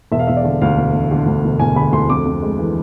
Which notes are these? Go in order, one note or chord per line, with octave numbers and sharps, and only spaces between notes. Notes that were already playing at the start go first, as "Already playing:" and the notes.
E1 E5
F5
E1 E5
D5
D3
D2 F5
E1
E1
D3
D2
E1
E1 G#5
D3 B5
D2 C6
F2 D6
F2
G#3
E3